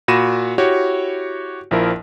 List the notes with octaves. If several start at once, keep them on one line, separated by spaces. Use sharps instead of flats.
A#2 F#4 B5 A#6 D#7 E7
E4 F#4 G4 C#5
A#1 F3 E4 A#4